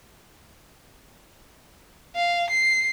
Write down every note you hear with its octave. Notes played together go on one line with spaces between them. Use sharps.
F5
C7